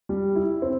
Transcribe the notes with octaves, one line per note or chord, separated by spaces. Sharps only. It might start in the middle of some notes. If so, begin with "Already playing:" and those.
G3
E4
C4